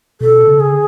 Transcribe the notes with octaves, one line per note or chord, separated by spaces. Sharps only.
B2 A4
C#3
G#4
D3